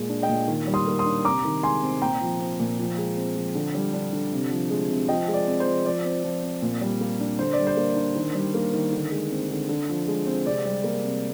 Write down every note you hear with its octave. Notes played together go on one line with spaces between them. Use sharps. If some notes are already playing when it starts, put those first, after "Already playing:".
Already playing: A#2 G#3
D4
D#5 G5
A#2
D#3
G3
C6 D#6
A#3
C6 D#6
D4
C3 A#5 D6
D#3
G#3 G#5 C6
C4
A#2 G5 A#5
F3
C4
A#2
F3
G#3
C4
F3
D3
G3
D4
D3
C3
F3
G#3
C3
F3 D#5 G5
G#3
D5
C4
C5
F3
F3 D5
C4
F3
C4
A#2
G3
A#3
D4
D3 C5
D5
G3
C5
A#3
D4
D#3
G3
A#3
D#3
D3
G#3
C4
D3
D3
F3
G#3
C4
C3 D5
G3
A#3
C3